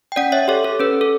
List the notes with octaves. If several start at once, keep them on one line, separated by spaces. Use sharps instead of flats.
G5
C#4 D5 F#5
C#5 E5
G4 A4 C#5
A4
C#4 B4
A4